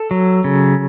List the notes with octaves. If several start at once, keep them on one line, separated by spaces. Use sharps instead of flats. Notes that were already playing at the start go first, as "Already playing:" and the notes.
Already playing: A4
F#3
C#3